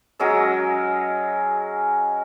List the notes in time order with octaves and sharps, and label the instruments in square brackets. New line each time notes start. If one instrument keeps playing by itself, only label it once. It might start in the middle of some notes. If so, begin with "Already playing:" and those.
[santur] F#3 G#3 C#4 E6